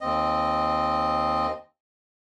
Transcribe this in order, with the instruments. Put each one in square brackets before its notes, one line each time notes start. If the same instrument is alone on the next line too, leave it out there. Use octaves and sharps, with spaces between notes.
[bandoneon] D#2 C4 D#5